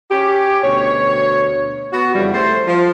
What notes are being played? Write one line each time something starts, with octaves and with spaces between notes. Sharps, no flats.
C#4 G4
D2 B2 C#5
B3 F#4
F2 C#3 E3 G3
A3 C5
F3